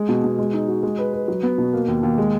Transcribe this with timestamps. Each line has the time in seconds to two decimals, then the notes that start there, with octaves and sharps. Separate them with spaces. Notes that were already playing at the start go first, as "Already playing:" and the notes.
Already playing: G#3
0.09 B2
0.24 B2
0.39 G#3
0.53 D#4
0.68 F#4
0.83 G#3
0.98 B4
1.13 B4
1.28 F#3
1.43 B3
1.58 B2
1.73 A#3
1.88 D#2
2.03 D#2
2.18 G#3